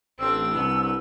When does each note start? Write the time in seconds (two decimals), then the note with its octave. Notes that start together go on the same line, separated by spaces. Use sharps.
0.19 A1 C4 D4 E6
0.53 C2 B3